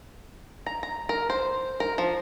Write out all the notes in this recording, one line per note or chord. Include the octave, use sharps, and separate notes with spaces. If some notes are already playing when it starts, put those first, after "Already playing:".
A#5
A#5
A#4
C5
A#4
F3